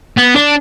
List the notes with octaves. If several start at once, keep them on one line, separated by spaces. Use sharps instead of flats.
B3
D4